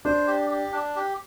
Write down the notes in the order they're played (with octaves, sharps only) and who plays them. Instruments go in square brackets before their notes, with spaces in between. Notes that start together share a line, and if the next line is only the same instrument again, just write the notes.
[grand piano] D4 [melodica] C5
[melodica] G4
G4
D4
G4